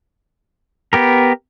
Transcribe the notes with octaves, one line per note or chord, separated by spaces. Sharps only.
B3 G4 A#4